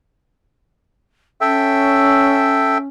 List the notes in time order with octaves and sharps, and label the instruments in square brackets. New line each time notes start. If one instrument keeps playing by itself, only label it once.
[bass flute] C#4 [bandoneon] A4 E5 G5